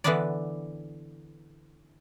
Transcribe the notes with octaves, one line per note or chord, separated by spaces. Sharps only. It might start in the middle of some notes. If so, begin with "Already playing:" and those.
D3 E3 B3 D4 B4 D5